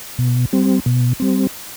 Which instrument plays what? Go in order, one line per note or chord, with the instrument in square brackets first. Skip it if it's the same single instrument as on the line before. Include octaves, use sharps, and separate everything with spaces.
[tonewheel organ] B2
G3 C4
B2
G3 C4